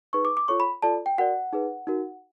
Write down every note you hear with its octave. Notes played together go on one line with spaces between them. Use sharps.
D#4 G#4 B4 C#6
D6
D6
F4 A4 C#5 C#6
B5
F4 A4 D5 A5
G5
F#4 A#4 D5 F#5
D#4 G#4 B4
D#4 F#4 A#4